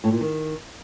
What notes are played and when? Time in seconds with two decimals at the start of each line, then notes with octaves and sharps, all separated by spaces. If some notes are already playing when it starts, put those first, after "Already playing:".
0.04 A2
0.12 A#2
0.21 D#3